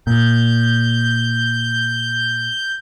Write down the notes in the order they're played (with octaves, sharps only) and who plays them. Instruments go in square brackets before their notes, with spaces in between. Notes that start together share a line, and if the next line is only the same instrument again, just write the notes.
[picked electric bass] A#2 [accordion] G6